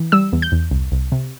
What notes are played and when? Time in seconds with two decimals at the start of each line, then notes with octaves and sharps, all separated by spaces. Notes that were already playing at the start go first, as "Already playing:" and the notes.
Already playing: E3
0.12 G3 E6
0.33 E2
0.42 G6
0.52 E2
0.71 C2
0.92 C2
1.12 C3